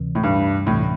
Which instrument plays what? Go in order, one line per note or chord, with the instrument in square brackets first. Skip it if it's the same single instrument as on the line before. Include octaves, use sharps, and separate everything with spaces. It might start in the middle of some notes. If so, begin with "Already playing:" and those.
Already playing: [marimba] D2 C3 E3
[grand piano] A2
G2
[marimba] D2 C3 E3 [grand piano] A2